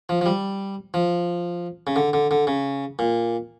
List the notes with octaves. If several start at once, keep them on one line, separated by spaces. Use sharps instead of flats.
F3
F3
G3
F3
C#3
D3
D3
D3
C#3
A#2